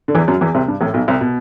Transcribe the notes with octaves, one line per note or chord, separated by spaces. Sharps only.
D3
E2 E3
F#2 F#3
E2 E3
C2 C3
G2
A1 A2
B1 B2
C2 C3
B2